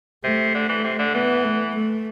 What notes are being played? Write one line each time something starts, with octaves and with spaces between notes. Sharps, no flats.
C3 A3
D3
E3
C3
D3
E3 B3
A3
A3